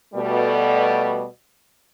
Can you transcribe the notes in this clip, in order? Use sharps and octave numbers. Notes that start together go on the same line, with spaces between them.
B2 G3 A3